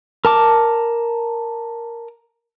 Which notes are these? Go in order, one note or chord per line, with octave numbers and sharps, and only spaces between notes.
A#4 A5 D6